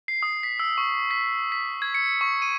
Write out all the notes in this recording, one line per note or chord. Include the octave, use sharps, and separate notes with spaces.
C7
D#6
B6
E6
C#6
B6
B6
G#6
C#7
C#6
D#7